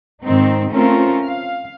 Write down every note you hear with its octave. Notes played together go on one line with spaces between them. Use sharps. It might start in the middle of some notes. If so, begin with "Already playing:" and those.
G#2 D#3 C4 D#4
A3 C4 C#4 F4 A#4
F5